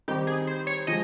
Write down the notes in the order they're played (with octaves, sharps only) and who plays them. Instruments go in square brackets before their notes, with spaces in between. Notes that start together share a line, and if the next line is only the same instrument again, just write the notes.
[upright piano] D#3 G3 C4 D#4 [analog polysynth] G4
[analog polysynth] G#4
C5
C#5
[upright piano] F3 G#3 [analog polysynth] D#5